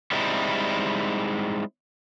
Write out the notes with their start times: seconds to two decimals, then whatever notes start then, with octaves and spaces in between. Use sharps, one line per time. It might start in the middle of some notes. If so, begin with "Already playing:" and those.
0.12 G3 G#3 C4 D#4 E4